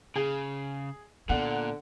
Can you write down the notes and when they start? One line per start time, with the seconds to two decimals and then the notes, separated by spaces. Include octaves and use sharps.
0.16 C#3 G#4
1.29 A#2 D3 B3 F#5